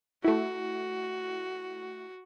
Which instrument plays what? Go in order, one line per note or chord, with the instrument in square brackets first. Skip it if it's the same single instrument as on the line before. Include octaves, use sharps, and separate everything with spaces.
[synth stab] A3 E4 [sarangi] F#4